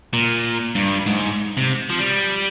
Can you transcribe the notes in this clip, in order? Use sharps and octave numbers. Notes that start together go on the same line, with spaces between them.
A#2
G2
G#2
C3
F3
G3